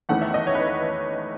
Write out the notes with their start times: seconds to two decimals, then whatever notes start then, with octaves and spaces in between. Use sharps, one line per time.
0.09 E2 D#3 A3 C#4 E4 F#5
0.22 E5
0.34 D#5
0.47 C#5
0.55 B4